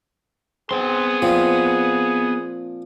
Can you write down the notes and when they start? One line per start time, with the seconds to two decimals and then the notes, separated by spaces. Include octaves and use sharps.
0.71 B3 C4 G#4 C6
1.22 A#2 F3 C4